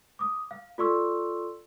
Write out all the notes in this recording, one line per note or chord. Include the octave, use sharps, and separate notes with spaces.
D6 D#6
F5
F4 A4 D5 C6 C#6 E6